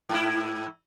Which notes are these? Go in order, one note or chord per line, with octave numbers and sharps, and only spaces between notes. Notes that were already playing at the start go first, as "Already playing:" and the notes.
G#2 E4